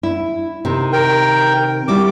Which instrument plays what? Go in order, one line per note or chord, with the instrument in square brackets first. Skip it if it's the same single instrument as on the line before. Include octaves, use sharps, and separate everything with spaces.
[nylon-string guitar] E4
C3 D#3
[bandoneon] A#4 G5
[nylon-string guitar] G3 E4 F#4 [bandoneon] D6